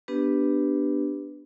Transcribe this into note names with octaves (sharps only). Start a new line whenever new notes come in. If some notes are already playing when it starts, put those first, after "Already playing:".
B3 D4 G4 B4